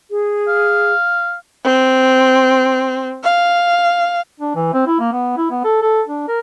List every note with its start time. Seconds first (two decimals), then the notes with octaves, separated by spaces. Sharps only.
0.11 G#4
0.48 F5
1.64 C4
3.24 F5
4.40 D4
4.55 E3
4.74 C4
4.87 E4
5.00 A#3
5.12 B3
5.37 E4
5.51 B3
5.64 A4
5.81 A4
6.08 D4
6.28 A#4